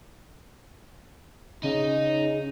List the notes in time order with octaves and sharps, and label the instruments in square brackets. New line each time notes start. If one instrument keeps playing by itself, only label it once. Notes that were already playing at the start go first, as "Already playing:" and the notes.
[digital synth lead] C#3 [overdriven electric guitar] D#4